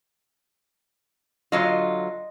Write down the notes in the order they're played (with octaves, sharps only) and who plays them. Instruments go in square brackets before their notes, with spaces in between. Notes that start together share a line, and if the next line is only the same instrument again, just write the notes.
[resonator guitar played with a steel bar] D3 F#3 F4 [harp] D#5 C6